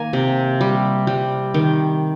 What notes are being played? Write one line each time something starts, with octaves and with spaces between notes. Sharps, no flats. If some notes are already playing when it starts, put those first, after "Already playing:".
Already playing: D#3 A#3 G#5 A#5
C3
G3
G3
D#3